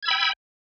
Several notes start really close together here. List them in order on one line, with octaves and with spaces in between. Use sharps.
G#6 E6 B5 G5